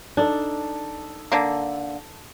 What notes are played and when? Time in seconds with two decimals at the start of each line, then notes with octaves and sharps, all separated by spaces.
0.17 D4 D#4 A4
1.32 D3 A#3